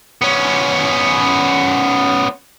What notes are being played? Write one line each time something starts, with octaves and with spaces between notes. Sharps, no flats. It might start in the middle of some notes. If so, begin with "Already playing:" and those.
B3 C#4